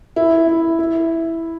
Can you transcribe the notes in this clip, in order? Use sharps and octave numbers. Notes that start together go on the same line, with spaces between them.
E4
E4
E4